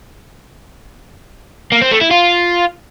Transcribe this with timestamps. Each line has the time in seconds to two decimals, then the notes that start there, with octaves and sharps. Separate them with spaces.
1.72 A#3
1.82 C4
1.91 A3
2.01 E4
2.11 F4